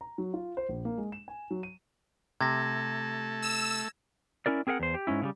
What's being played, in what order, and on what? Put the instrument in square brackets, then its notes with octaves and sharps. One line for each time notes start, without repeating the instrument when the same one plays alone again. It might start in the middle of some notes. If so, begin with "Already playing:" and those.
[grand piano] A#5
F#3
F4
C5
A#1
A#3
G#3
E7
G#5
F#3
D#7
[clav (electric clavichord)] C3 [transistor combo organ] A3 A5 [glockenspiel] G#6 A#6
[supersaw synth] E6 E7
[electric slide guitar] C#4 E4 A#4 D5
C4 G#4 A#4 F5 F#5
E2 C5
G4
G#2 C3 C#4 E4
C#3 F3 G3